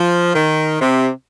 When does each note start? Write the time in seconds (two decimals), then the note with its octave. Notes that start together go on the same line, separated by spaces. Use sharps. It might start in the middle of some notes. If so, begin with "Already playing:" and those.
Already playing: F3
0.35 D#3
0.81 C3